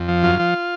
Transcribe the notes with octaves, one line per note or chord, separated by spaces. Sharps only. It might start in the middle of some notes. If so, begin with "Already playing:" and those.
Already playing: F2
F3
F#2 F4
F3